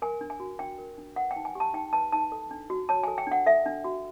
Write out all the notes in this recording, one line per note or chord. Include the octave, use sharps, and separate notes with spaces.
A#4 G#5
D4
G#5
F#4
D4 G5
A#4
D4
B4 F#5
G5
D#4
G#5
G4 A5
D#4 G5
B4 A5
D#4 A5
A4
D4
F#4
C#5 A5
A4 G#5
G5
D4 F#5
A4 E5
D4
F#4